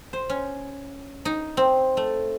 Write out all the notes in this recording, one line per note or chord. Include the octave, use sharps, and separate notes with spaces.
C5
C#4
D#4
C4
A3